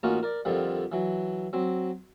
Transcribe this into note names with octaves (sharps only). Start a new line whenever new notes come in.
A1 A#3 C#4 D#4 F4 F#4
A#4 D5
F2 D3 D#3 F3 G3
E3 F#3
F#3 C4